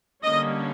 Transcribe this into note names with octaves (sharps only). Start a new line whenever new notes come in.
D3 G3 A#3 C#4 D#5